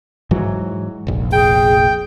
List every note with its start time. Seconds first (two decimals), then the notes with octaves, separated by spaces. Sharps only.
0.31 G#2 E3 F#3
1.07 F1 A#1
1.33 G#4 G5